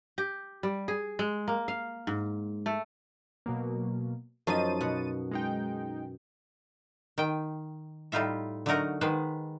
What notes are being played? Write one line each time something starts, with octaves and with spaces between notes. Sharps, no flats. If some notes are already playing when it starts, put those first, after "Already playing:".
G4
G3
G#4
G#3
A#3
F5
G#2
A3
B2 F#3 A#3
F#2 F3 D#4 C5 A6 D#7
B2 F#5
G#3 D#4 G5
D#3 G5
A2 G3 D#4 F4 E5
D3 F#3 A3 D#4 A#4 F#5
D#3 G#3 B3 B4 C5